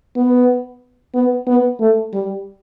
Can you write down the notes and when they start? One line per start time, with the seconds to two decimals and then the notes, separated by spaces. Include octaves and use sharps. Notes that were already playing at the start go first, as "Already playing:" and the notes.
0.16 B3
1.15 B3
1.47 B3
1.80 A3
2.13 G3